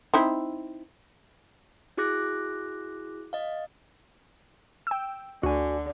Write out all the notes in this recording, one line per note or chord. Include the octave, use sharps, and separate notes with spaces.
C4 D#4 E4
E4 F#4 G#4 D6 F#6 A#6
D#5 F5
G5 E6
D2 D3 F#4 G#5